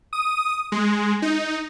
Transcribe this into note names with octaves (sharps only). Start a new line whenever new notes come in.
D#6
G#3
D#4